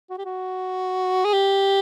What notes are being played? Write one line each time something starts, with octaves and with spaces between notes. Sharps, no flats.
F#4
G4
F#4
G#4
G4